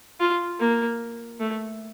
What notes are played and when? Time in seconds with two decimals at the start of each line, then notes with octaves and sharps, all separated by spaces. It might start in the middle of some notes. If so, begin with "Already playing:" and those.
0.20 F4
0.60 A#3
1.40 A3